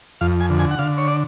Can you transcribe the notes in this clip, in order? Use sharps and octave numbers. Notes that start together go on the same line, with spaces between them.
F2 F5
G#5
D3
G#5
F#5
D3 F5
C#5
D5